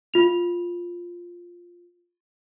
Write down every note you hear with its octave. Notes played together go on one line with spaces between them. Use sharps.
F4 F7